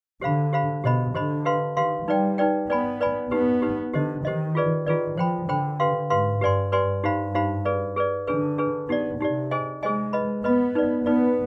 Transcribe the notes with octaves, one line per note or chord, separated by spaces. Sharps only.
D3 G4 C5 F5 B5
G4 C5 F5 B5
B2 G4 C5 D#5 B5
D3 G4 C5 D#5 B5
G4 B4 F5 C6
D#3 G4 B4 F5 C6
G3 D#4 B4 D5 G5
D#4 B4 D5 G5
B3 B4 D5 G#5 B5
B4 D5 G#5 B5
B3 D#4 G4 B4
D#4 G4 B4
D3 G4 C5 D#5
D#3 G4 C5 D#5
F4 G#4 B4 D5
D#3 F4 G#4 B4 D5
F3 C5 G5 B5
D3 C5 G5 B5
G4 B4 F5 C6
G#2 G4 B4 F5 C6
G2 G4 B4 D5 G#5 C6
G4 B4 D5 G#5 C6
G2 D#4 G4 C5 F5 B5
D#4 G4 C5 F5 B5
G#4 B4 D5
G#4 B4 D5
D3 D4 G#4 B4
D4 G#4 B4
B3 D#4 G4 D5
C3 D#4 G4 D5
G#4 C5 D#5 G#5
G#3 G#4 C5 D#5 G#5
B4 D#5 B5
B3 B4 D#5 B5
D#4 B4 D5
B3 D#4 B4 D5